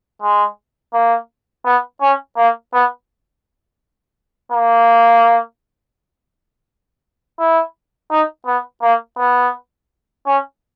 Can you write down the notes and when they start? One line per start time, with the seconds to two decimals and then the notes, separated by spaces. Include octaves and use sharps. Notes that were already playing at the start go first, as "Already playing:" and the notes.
0.22 G#3
0.93 A#3
1.66 B3
2.02 C#4
2.37 A#3
2.73 B3
4.52 A#3
7.39 E4
8.11 D#4
8.47 B3
8.83 A#3
9.18 B3
10.26 C#4